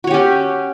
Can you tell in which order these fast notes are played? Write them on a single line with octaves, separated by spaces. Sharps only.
F#4 C#5 G4 C#4